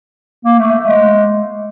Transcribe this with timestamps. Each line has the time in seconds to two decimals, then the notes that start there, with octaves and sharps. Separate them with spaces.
0.45 A#3
0.59 A3
0.72 A3
0.86 G#3